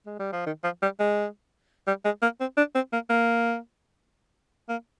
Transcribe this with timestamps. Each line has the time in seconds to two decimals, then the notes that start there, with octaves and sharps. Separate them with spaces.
0.06 G#3
0.19 G3
0.32 F3
0.46 D#3
0.64 F3
0.82 G3
1.00 G#3
1.87 G3
2.05 G#3
2.22 A#3
2.40 C4
2.57 D4
2.75 C4
2.93 A#3
3.10 A#3
4.69 A#3